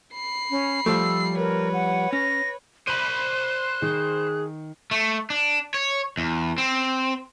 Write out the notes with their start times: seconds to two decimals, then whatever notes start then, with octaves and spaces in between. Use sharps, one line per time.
0.14 B5 C7
0.51 C#4
0.86 F3 G3 A3 E6
1.37 A#4 B4 C#5
1.73 F#5
2.13 C#4 A#6
2.87 C5 B5 F#6 D#7
3.82 D#3 G#4
4.91 A3
5.30 D4
5.74 C#5
6.17 E2
6.58 C4